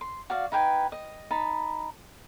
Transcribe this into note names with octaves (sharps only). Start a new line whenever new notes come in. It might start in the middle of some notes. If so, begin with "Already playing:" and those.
C6
F#4 D5 F5
D#4 B4 G5 G#5
D#5
D#4 A5 B5